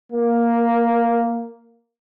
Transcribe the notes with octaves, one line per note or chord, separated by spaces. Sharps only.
A#3